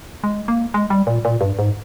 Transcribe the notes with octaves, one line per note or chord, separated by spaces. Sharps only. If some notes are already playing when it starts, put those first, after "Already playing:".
G#3
A#3
G#3
G3
A#2
A#2
G2
G#2